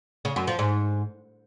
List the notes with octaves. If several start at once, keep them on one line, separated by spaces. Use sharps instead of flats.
C#3
F#2
F3
G#2